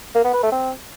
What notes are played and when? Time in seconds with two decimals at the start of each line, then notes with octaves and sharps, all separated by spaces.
0.15 A#3
0.24 B3
0.34 B4
0.43 A3
0.52 C4